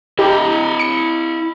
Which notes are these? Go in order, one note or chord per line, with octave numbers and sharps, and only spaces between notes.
E4 G4 D#5
C#7